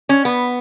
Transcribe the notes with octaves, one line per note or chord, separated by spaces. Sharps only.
C#4
B3